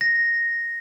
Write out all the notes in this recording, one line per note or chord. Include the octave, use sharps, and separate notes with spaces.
A#6